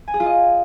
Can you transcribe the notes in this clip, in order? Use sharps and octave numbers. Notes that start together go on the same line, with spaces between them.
G#5
G#4
F4
D#5